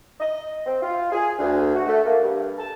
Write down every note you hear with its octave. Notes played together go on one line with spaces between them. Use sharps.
D#5
C4
F4
G#4
D2
F#4
A3
A#3
G2
A5